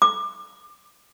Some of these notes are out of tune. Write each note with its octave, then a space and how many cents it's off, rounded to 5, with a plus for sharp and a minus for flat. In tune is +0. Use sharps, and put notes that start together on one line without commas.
D6 +25